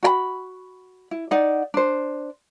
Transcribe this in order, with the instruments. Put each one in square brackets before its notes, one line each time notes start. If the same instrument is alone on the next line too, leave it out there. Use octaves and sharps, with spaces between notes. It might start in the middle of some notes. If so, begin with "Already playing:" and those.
[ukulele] F#4 G5 B5
E4
D#4 D5 F#5
D4 C5